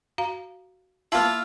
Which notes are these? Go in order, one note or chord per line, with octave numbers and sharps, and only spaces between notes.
F#4 F5 A#5
A#3 E4 F4 A5